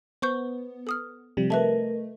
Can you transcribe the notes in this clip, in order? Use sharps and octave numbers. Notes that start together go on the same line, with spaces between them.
B3 C5 C#6 G6
A4 D#6 F6
C3 F3 G3
A3 A#4 B4 D#5 E5 A5